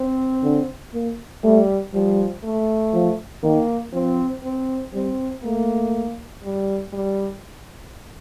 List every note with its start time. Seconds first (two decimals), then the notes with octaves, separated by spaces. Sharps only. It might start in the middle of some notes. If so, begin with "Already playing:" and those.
Already playing: C4
0.43 D3
0.94 A#3
1.44 G3 A3
1.94 F3 G3
2.44 A3
2.94 F3
3.43 D#3 A#3
3.93 F3 C4
4.43 C4
4.94 G3 C4
5.43 A3 A#3
6.44 G3
6.93 G3